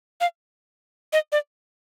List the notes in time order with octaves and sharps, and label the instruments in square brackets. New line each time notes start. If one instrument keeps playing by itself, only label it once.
[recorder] F5
D#5
D5